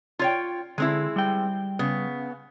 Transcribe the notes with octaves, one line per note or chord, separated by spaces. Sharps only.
F4 C#5 G5
D3 G#3 C4 E4
G3 G5
C#3 B3